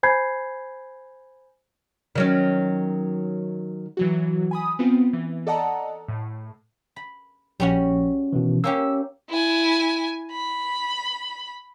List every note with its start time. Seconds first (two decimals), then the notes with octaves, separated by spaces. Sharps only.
0.03 C5 G#5 B5 G6 G#6 C7
2.15 D#3 F#3 C#4
3.97 E3 F#3 F#4
4.51 G#5 B5 D#6
4.79 B3 C4 F4
5.13 E3
5.47 A4 D5 D#5 F#5 A5 A#5
6.08 A2
6.96 B5
7.60 A#1 G3 C#4 F#4
8.33 B2 D#3 E3
8.64 A#3 C#4 G4 E6
9.30 E4 G#5
10.32 B5